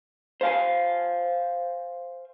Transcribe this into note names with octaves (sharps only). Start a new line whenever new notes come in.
C5 F5 G#5